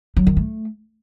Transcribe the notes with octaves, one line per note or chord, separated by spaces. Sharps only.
F#3
D#3
A3